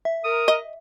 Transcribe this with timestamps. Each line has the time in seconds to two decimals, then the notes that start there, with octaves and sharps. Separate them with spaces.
0.05 E5
0.24 A#4 D#6
0.48 D#5